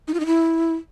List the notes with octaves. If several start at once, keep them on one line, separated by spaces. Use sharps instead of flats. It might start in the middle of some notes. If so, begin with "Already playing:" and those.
D#4
F4
D#4
E4